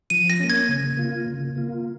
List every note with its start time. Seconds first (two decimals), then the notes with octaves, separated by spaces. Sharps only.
0.10 F3 D#7
0.30 A#6
0.40 A#3 C#4
0.50 G#6
0.69 C#3
0.97 A#3 F4
1.26 C#3
1.56 A#3 F4